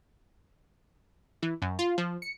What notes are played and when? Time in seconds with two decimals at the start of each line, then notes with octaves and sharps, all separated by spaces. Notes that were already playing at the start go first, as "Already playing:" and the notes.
1.42 E3
1.62 F#2
1.79 F4
1.98 F3
2.22 C#7